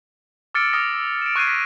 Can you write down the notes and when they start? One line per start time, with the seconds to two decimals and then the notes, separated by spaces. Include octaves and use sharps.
0.54 D6 E6 F6 A6 C#7 D7
0.73 D#6 F6 A#6
0.94 E6
1.22 D7 E7
1.36 C#6 F#6 G#6 C7 D#7
1.47 F#6 A#6 B6